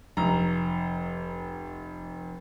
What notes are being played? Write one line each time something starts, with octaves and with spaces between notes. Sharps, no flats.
F1 A#5